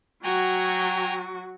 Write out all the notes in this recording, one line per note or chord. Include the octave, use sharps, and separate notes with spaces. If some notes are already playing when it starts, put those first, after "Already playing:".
F#3 F#4 G5 G#5 A#5